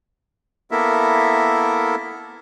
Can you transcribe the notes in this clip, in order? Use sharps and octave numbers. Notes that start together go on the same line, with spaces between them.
A#3 B3 E4 A4 A#4 E5